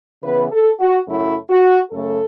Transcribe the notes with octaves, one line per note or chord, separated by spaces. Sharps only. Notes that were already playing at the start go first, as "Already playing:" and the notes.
C#3 E3 B3 B4
A4
F#4
F#2 C#3 F#3 A3 E4
F#4
F#2 C#3 A3 A4